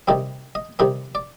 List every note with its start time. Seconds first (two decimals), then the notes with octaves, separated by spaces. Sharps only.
0.08 C3 D#3 G3 C4 D#5
0.55 D#5
0.79 C3 D#3 G3 C4 D#5
1.15 D5